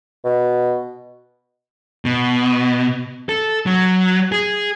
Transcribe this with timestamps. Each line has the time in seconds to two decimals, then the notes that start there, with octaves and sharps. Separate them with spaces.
0.24 B2
2.05 B2
3.29 A4
3.66 F#3
4.32 G#4